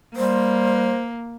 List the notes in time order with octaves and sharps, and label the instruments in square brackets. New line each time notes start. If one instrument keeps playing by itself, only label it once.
[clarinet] G3 [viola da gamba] A#3 [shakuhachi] C5